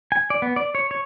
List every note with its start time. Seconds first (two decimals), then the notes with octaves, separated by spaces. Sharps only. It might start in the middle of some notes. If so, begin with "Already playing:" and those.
0.12 G#5
0.30 D5
0.42 B3
0.56 D5
0.75 C#5
0.91 C#5